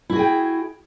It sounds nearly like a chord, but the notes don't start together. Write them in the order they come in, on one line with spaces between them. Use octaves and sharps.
E4 F#4 G#4 G5